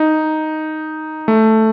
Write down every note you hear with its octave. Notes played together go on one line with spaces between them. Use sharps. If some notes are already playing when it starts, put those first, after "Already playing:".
Already playing: D#4
A3